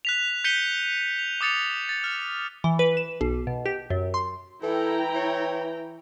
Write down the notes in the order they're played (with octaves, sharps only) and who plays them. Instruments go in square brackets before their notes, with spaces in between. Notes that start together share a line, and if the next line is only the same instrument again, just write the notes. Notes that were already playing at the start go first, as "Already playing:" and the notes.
[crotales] F#6 B6 F7
G6 B6 C#7 D#7 G7
F7
D6 D#6 A6 C#7 F7
A6
F6
[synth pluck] E3
B4
E7
B1
B2
G4
F#2
C6
[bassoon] E3 [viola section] E4 G5 A#5 [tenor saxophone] A4
[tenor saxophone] C#5